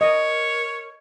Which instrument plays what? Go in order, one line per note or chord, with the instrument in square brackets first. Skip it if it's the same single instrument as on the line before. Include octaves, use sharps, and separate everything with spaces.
[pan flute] A#4 [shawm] C#5 [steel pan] D#5